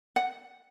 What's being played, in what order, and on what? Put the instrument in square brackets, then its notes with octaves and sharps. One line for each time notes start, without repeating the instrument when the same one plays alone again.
[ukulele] F#5